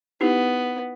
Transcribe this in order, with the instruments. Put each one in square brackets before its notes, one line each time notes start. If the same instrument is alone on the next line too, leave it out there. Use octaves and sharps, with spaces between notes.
[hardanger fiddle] B3 [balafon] D#4 E4 G4